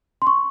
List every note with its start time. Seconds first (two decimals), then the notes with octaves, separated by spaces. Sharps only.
0.22 C6
0.27 C#6